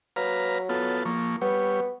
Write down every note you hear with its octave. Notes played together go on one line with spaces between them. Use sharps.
F#3 B4 F5 A#5
B3 F4 A4
F3 A#3 C#6
G3 B3 C#5